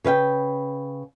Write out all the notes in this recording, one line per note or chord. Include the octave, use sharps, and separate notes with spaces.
C#3 B4 F5 G5